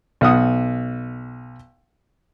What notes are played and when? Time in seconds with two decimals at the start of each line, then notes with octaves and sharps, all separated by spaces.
0.21 B1 F#5 D#6